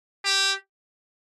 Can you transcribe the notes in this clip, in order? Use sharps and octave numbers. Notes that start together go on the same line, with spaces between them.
G4